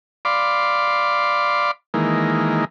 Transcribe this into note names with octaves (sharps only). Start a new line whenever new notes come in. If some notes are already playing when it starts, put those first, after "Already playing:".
D5 F5 B5 C6 D6
D#3 E3 G#3 A#3